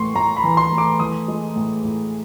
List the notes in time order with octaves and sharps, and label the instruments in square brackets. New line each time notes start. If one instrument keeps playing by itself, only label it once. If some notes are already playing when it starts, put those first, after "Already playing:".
Already playing: [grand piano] A2 E3 A3 C6 C#6
A2 A#5
B5
E3
C6
A3
D6
E3 D#6
G#3
A2
A2